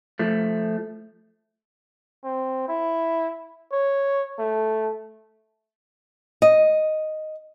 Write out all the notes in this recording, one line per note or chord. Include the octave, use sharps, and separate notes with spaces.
F3 A3
C4
E4
C#5
A3
D#5